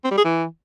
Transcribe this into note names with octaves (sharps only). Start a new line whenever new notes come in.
C4
G3
G#4
E3